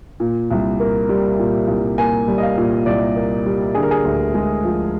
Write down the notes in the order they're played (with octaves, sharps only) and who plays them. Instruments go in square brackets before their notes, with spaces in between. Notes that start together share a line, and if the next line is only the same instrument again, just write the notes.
[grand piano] A#2
C2
A#3
G3
A#2
C2
A#3 G#5
G3
D#5
F5
A#2
C2 D5
A#3
G3
D3 G#4
A#4
G#4
D2
G#3
F3